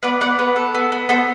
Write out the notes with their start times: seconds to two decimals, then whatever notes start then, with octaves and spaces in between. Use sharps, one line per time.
0.03 B3 B4 D5
0.21 B3 D5 F#5
0.39 B3 B4
0.56 A4
0.75 B3
0.92 B3
1.09 B3 A4 C5